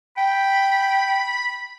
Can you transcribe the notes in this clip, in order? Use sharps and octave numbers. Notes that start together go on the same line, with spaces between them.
G5 B5